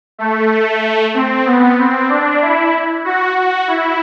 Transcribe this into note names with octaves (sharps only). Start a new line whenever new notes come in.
A3
C4
B3
C4
D4
E4
F#4
F#4
E4